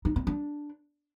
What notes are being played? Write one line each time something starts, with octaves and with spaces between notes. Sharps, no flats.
D#4
C4
D4